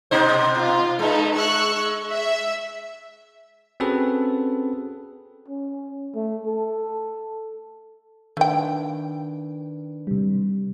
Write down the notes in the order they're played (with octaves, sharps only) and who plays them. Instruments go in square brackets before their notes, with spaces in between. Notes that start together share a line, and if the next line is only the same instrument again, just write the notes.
[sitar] B2 D#4 C5
[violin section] F4
[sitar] G#3 [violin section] D#4 A4 B4
[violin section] C#6 E6 F#6
E5
[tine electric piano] C4 C#4 F#4 G#4 A4 B4
[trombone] C#4
A3
A4
[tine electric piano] D#3 D4 B4 [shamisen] A3 G5
[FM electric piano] C3 G3